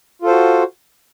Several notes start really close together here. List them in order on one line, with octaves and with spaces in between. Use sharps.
F4 A4 C5 F#4